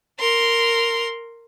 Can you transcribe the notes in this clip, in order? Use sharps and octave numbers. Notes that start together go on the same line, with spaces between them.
A#4 C6